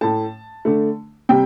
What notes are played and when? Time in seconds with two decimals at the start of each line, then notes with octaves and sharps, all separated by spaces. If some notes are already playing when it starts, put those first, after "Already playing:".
0.01 A2 A3 A5
0.65 D3 A3
1.29 C3 G3 G5